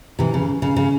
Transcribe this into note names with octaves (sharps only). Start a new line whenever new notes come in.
C3 E3
C#3
C#3
C#3